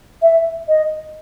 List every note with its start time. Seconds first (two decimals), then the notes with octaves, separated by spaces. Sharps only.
0.22 E5
0.68 D#5